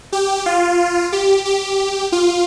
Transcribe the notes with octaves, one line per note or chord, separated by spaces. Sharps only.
G4
F4
G4
G4
F4